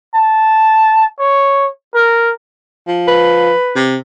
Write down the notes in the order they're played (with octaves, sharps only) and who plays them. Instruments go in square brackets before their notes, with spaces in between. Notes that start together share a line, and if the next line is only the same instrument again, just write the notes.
[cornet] A5
C#5
A#4
[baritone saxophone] F3
[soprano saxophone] B4
[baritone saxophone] C3